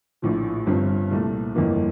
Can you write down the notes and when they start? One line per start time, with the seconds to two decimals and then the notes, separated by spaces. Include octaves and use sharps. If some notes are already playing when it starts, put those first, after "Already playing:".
0.22 A#1 A2 F3
0.67 G1 G2 F3 C4
1.11 C2 A#2 A3
1.55 G1 F2 E3 A#3